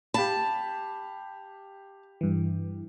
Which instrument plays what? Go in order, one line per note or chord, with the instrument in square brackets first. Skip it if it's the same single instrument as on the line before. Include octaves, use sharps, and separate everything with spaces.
[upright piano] G4 F5 B5 [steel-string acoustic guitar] A5
[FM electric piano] G2 E3